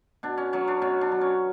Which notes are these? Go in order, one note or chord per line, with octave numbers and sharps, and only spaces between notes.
B2 D4
C#4
F#3 C#4
D4
B2 C#4
D4
F#3
C#4